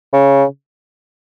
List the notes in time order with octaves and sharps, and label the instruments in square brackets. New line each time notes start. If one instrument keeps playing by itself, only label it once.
[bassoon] C#3